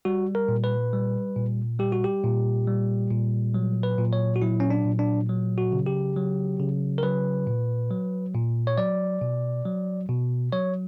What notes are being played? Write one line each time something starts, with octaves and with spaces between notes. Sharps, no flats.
G3 F#4
A#4
A#2
B4
G3
A#2
G3 G4
F#4
G4
A#2
G3
A#2
F#3
B4
A#2
C#5
F#4
F#3 E4
C#4
D4
A#2
D4
F#3
F#4
C#3
G4
F#3
C#3
A#4
F#3 B4
A#2
F#3
A#2
C#5
F#3 D5
B2
F#3
B2
F#3 C#5